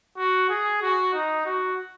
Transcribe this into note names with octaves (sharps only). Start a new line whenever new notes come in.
F#4
G#4
F#4
D#4
F#4